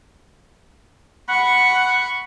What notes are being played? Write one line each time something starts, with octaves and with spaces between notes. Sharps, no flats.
F#5 B5 C#6